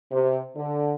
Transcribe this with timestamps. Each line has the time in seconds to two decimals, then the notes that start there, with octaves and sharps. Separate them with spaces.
0.12 C3
0.57 D3